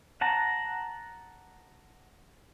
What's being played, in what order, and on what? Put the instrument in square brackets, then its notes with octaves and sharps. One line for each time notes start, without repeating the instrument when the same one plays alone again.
[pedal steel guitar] F#5 A5 A#5